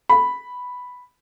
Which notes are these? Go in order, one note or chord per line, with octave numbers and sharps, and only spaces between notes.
B5